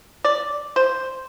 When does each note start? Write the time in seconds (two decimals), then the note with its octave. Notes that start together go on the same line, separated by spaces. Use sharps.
0.25 D5
0.76 C5